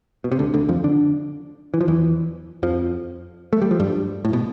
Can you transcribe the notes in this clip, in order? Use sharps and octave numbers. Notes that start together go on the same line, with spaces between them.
B2
C3
D2 D3
D2 D3
F2 F3
D3 D4
E3
F3
E2 E3
F2 F3
A3
G3
F3
G2 G3
A2
B2